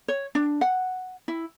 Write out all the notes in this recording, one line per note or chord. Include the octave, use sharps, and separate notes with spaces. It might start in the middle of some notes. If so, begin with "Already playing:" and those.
C#5
D4
F#5
E4